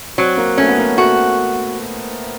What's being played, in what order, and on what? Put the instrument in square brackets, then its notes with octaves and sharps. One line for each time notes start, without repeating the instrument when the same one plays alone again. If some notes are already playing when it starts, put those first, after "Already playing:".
[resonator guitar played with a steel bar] F#3 [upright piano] C4
[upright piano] A#3
[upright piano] A3 [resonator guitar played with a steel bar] C#4
[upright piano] B3
A#3
[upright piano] A3 [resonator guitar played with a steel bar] F#4